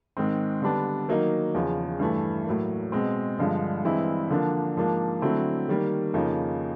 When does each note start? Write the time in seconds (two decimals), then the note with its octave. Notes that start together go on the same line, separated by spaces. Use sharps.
0.17 G#2 D#3 G#3 C4
0.62 D3 G3 B3 D4
1.08 D#3 F#3 A#3 D#4
1.55 E2 C#3 F3
2.00 G2 E3 A3
2.46 A2 F#3 A#3
2.92 B2 G#3 C4
3.38 G2 D3 F3 G#3
3.84 G2 E3 G#3 C4 E4
4.30 D3 F3 A#3 D4
4.77 G#2 F3 A#3 D4
5.21 D3 F#3 A3 C4 E4
5.69 D#3 G3 A#3
6.14 F2 C#3 F3 A#3 D#4